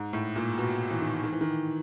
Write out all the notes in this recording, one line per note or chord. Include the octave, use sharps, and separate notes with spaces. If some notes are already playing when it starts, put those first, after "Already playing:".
Already playing: G#2
A2
A#2
B2
E3
D#3
D#3
E3
D#3